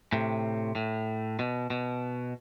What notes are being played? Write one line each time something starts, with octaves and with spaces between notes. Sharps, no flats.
A2 C3
A2
B2
B2